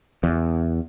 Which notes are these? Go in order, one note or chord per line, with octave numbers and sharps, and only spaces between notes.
E2